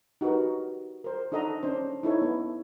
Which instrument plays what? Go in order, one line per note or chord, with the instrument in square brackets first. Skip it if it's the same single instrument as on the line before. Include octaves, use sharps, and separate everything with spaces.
[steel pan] D#4 F#4 G4 A#4 B4
A#4 C5
D4 D#4 A4 D#5 F#5 A#5
C#4 D4 C5
D#4 E4 A4 C#5
B3